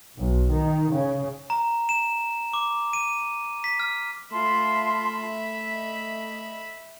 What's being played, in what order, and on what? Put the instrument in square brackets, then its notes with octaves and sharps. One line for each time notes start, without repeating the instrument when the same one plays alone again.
[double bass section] B1
D#3
C#3
[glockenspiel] A#5
E7
D6
D#7
B6
F6
[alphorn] A3 [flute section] F4 A5 C6 [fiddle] E5 B5
[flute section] D#5